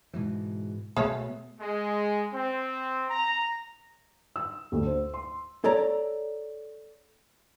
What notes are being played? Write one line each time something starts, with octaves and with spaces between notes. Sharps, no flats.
G#2 B2 E3
B2 A3 B3 G#4 C#5 E5
G#3
C4
A#5
E6
D2
C5
C6
A4 C#5 D5 A#5